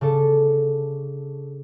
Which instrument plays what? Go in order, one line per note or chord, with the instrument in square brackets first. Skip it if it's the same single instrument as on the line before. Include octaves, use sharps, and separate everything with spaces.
[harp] C#3 D4 A4